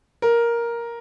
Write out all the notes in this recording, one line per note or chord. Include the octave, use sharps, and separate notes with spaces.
A#4